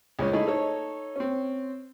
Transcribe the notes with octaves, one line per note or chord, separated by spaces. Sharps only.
C#2 G#3 C#4
A3 D#4 E4 G#4
D#4 A4 C#5
C4 C#4